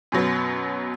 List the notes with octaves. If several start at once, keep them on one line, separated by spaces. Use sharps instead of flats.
F#2 B2 F#3 B3